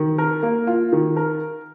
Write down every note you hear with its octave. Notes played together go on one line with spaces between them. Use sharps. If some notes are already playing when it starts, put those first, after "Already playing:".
Already playing: D#3
A#4
A#3
F4
D#3
A#4